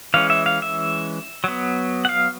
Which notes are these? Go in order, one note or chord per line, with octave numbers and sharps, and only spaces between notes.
E3 G#3 C#4 F5
E5
F5
E5
F#3 B3
F#5
F5